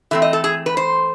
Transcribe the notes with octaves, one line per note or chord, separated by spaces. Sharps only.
E3 A3 C4 E5
D#5
A4
G#4
B4
C5